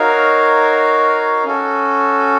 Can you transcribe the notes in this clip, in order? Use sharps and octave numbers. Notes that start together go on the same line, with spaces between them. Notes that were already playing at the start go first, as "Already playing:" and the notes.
Already playing: D#4 F#4 A#4 C#5 F5
C#4 F#4 A4